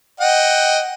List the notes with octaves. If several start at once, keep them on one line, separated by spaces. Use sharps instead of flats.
D#5 F#5 G5